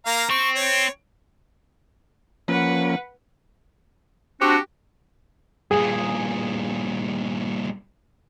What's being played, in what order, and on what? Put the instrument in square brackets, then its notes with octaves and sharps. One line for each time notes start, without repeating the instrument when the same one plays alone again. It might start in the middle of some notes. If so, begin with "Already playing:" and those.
[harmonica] A#3 F5 A#5
[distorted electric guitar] C4 [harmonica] C#6
[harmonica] C#5
[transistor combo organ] F3 A#3 C#4 [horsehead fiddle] B4 F#5
[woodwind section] C4 D4 F#4 [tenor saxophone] G4
[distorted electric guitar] G2 A#2 [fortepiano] G#4